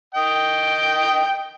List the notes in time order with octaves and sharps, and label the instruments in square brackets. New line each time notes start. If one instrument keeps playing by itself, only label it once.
[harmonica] D#5 G5